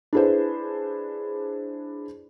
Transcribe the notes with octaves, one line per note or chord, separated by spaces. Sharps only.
D4 E4 G#4 B4 C5